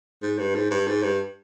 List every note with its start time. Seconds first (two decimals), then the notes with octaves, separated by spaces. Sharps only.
0.23 G#2
0.39 G2
0.55 G#2
0.71 G2
0.87 G#2
1.03 G2